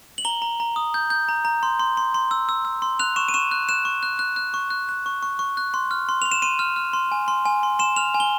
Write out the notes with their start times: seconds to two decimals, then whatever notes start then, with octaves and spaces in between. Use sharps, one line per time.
0.18 F#7
0.25 A#5 G7
0.42 A#5
0.60 A#5
0.76 D#6
0.94 G6
1.10 G6
1.29 A#5
1.45 A#5
1.63 C6
1.80 C6
1.97 C6
2.14 C6
2.31 E6
2.49 E6
2.65 E6
2.82 C6
2.99 F#6 F7
3.16 C#6 E7
3.28 D#7
3.34 C#6 E7
3.51 F#6
3.69 F#6 E7
3.85 C#6
4.03 F#6
4.19 F#6
4.36 F#6
4.54 C#6
4.70 F#6
4.89 F#6
5.06 C#6
5.23 C#6
5.39 C#6
5.57 F#6
5.74 C6
5.91 F6
6.09 C6
6.22 C6 F7
6.32 E7
6.42 C6 D#7
6.59 F6
6.76 F6
6.93 C6
7.12 G#5
7.28 C6
7.46 G#5
7.63 C6
7.79 C6 E7
7.96 F6 F7
8.14 G#5
8.20 G7